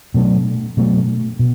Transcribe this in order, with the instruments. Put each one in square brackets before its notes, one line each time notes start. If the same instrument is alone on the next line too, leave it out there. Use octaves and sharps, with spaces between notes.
[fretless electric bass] B2 F#3 A3 D4
B2 F#3 A3 D4
B2